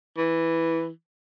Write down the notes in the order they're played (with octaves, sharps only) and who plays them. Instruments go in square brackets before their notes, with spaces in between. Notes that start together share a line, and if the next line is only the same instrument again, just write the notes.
[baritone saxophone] E3